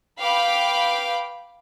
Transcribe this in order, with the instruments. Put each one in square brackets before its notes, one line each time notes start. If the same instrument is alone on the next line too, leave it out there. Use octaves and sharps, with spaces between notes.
[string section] B4 F5 G5 B5 D6